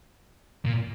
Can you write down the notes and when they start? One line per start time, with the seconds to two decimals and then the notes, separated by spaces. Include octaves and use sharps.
0.65 A#2